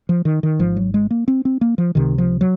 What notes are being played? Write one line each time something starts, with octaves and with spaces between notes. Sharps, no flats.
F3
D#3
D#3
G#1 G#2 F3
F#3
G#3
A#3
C4
C4
A#3
F3
C#2 C3 D#3
F3
F#3